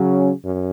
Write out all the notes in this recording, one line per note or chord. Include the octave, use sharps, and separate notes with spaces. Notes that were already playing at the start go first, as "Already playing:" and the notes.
Already playing: C#3 F#3 C#4
F#2